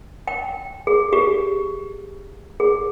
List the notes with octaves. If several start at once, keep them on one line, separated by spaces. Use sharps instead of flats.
G5
G#4
G4
G#4